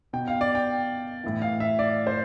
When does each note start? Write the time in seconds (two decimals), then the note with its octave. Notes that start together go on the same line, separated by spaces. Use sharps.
0.13 B2 G5
0.28 F5
0.41 D5
0.55 G5
1.24 A2 E3
1.42 F5
1.60 E5
1.79 D5
2.07 C5